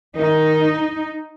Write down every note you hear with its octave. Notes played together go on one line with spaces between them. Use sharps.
D#3 D#4